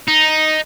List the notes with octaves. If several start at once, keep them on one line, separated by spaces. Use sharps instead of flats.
D#4